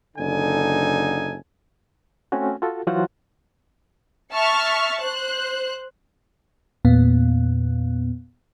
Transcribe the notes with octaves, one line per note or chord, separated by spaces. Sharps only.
F#1 D3 D#4 A4 G#5
A3 C4 C#4 F#4
F4 F#4 A4
E3 F#3 F4 F#4 C5 F#5
E5 A5 C#6 F6
C5 F#6
E2 A#2 B3